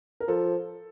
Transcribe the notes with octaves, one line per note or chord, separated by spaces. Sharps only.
A#4
F3 A4